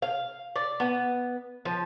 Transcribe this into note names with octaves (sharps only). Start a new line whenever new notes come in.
F5
D5
B3
F3